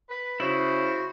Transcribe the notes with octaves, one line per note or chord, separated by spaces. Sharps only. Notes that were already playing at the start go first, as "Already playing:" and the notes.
B4
C#3 E4 F#4 C5